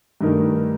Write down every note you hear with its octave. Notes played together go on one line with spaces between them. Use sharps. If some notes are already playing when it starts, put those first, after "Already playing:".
G2 D#3 A3 D#4 A#4